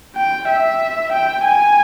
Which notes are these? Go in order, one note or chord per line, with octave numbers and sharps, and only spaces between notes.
G5
E5
G5
G#5